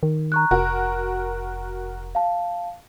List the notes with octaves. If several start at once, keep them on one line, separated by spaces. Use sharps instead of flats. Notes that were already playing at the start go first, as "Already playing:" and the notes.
D#3
A#5 C#6 F#6
F1 F#4 A#4
F5 A5